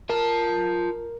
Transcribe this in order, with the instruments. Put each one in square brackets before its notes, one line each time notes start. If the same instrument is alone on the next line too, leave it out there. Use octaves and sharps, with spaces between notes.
[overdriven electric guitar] F4 A5 [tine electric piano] A#4